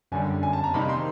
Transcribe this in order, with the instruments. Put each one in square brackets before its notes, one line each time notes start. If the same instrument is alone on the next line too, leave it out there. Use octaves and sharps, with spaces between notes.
[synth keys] F#2 D3 G3 [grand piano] G#5
[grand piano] G#5
A5
A#5
[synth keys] C3 D#3 G3 A#3 D#4 [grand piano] B5
[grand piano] C6